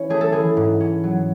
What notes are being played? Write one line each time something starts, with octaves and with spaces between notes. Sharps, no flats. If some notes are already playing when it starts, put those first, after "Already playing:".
Already playing: E3 C#4 C#5
A3 G#4
A4
E3 G#4
G#2
C#4
F#3